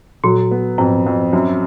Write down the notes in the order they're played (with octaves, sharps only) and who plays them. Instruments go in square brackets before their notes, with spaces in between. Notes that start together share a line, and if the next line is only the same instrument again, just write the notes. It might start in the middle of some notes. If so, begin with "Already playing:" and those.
[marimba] A#2 [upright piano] F#3
[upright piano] B3
[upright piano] F2 [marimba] G#2
[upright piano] F2
F#2